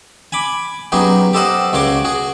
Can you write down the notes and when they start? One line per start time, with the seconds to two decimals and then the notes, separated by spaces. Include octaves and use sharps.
0.32 G#5 B5 D6
0.92 F#3 B3 C#4 D#4 G4 G#4
1.33 G4 A4 C5 D#5 F#5
1.73 C#2 C#3 F#4 C#5 C6 D6
2.05 F#4 G#4